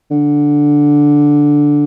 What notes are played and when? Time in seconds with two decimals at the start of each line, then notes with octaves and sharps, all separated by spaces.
0.11 D3